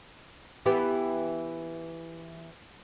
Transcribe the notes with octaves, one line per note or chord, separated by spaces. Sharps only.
E3 B3 G4